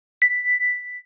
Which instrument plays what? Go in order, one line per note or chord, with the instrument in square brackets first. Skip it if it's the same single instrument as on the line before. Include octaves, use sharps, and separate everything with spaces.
[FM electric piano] B6